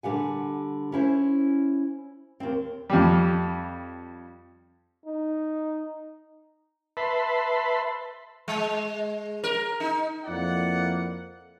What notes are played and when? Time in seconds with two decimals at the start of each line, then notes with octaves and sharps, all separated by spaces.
0.03 D3 G3 F#5 G#5
0.92 C#4 E4 C5
2.40 D#2 C4
2.90 F2 G3
5.05 D#4
6.97 B4 E5 A5 B5 C6
8.48 G#3
9.44 A#4
9.80 D#4
10.25 F2 A#3 E4 D5 F#5